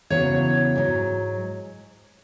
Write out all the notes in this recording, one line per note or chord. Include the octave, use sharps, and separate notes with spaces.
E2 C#3 F#3 C#5
G#2 F#3